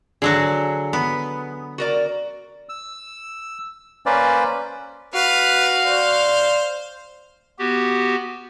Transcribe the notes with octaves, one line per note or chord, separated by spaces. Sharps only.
D3 F#3 F#4 G#4 F#5
B3
F#4 A#4 D5
E6
A#3 C#4 B4 C5 D5
F#4 B4 F5
C5 D5
B3 F#4 G4